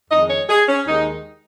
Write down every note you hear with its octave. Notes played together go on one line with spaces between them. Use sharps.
F2 D#3 G#3 D#5
C#5
G#4
C#4
D#2 D#3 G#3 D#4